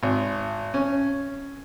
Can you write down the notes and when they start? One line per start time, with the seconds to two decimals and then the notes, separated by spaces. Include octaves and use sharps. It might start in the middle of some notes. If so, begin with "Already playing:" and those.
0.03 G#1
0.74 C#4